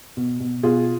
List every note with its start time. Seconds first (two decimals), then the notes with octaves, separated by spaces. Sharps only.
0.17 B2
0.40 B2
0.63 B2 F4 G#4